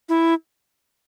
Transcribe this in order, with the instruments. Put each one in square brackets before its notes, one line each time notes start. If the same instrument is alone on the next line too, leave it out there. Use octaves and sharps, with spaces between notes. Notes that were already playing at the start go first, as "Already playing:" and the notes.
[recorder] E4